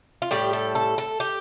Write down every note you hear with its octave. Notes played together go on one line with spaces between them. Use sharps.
F4
A2 G3 G4
A4
A4
A4
G4